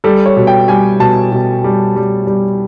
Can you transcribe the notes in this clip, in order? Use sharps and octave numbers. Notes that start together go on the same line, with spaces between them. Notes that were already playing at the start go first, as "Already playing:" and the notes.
G3 A4
C#5
B2
G5
G3 G#5
B2 A5
B2
G3
G3
G3